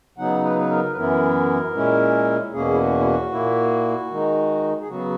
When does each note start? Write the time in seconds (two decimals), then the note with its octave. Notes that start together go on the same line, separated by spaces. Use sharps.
0.18 C#3 F#3 B3 D#4 F#5
0.44 B4
0.60 B4
0.70 A#4
0.92 B4
0.96 F#2 E3 B3 E4 A#4
1.74 A#2 G#3 C#4 E4
2.53 E2 B2 A#3 C#4 G#4
2.73 E4
2.80 F#4
3.00 E4
3.05 F#4
3.32 A#2 A#3 E4
4.10 D#3 G#3 D#4
4.81 G#4
4.88 C#3 F#3 B3 F#4